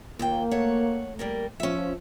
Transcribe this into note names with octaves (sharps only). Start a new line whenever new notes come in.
D#2 A#2 A#3 G5
A3 C#5 F#5
G3 A#3 A#4
F3 C#4 E5